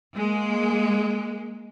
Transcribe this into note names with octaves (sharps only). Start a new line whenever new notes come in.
G#3 A#3